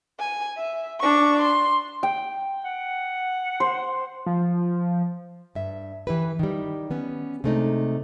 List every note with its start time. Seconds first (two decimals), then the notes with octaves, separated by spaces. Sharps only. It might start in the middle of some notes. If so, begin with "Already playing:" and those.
0.20 G#5
0.57 E5
1.00 D4 C#6
1.42 C6
2.03 G5
2.64 F#5
3.60 C5
4.26 F3
5.55 G2 E5
6.07 E3 E4 G4 B4
6.39 D#3 G3
6.90 G3 B3 C#4
7.44 C3 G#3 A3 D4 D#4